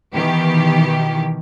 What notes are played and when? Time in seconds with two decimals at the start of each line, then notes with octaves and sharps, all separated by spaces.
0.13 B2 D#3 E3 G4